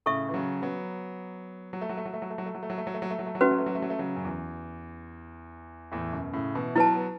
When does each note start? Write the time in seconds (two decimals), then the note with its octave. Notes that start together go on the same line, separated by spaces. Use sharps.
0.06 A2 C#3 A4 E5 C#6
0.29 E3
0.34 C#3 F#3
0.62 F#3 B3
1.73 F#3
1.81 A3
1.89 F#3
1.97 A3
2.05 F#3
2.13 A3
2.22 F#3
2.30 A3
2.38 F#3
2.46 A3
2.55 F#3
2.63 A3
2.70 F#3
2.78 A3
2.87 F#3
2.94 A3
3.02 F#3
3.11 A3
3.19 F#3
3.26 A3
3.35 F#3
3.41 A3 C#4 F#4 B4
3.51 F#3
3.58 A3
3.66 F#3
3.75 A3
3.82 F#3
3.90 A3
3.99 C#3 F#3
4.16 F#2
4.25 E2
5.92 E2 A2
6.13 F#2 B2
6.33 A2 C#3
6.55 B2 E3
6.76 F#3 B3 E4 B4 A5
6.96 B3